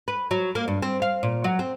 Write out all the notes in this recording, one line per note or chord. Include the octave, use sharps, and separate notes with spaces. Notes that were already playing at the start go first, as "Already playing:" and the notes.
B4
F#3
A#3
G2
C4
F5
A#2
F#3
C4